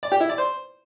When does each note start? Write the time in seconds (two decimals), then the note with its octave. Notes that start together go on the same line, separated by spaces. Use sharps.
0.03 D5
0.12 G4
0.20 E4
0.29 D5
0.38 C5